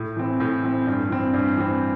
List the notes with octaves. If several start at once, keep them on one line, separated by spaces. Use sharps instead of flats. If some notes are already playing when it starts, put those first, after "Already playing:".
Already playing: A2
E3 C4
A2
E3 C4
G2
E3 C4
G2
E3 C4